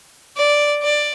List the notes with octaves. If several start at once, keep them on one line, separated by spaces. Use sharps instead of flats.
D5
D5